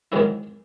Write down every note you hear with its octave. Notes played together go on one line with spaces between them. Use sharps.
G#2 D#3 G#3 C#4 E4 F#4